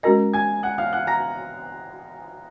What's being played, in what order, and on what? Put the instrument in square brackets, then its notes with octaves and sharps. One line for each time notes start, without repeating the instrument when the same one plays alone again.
[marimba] G#3 C#4 F#4 A#4 D#5 [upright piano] A#5 A#6
[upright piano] G#5 G#6
F#5 F#6
F5 F6
F#5 F#6
A#5 A#6